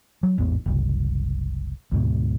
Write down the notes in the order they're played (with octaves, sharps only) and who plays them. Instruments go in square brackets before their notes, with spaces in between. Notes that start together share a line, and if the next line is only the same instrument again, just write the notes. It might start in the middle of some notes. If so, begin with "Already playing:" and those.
[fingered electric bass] F#3
A1 E2 G#2 B3
F#1 C2
D2 G#2 B2